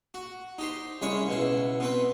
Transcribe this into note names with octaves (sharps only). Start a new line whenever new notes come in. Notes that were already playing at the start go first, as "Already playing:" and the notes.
F#4
D#4 G4 C5
C2 G#3 C#4 C#5 B5 C#6
C#2 B2 E4
B2 C4 B4